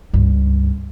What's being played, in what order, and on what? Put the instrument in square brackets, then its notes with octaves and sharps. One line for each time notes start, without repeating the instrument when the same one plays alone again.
[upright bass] C#2 G2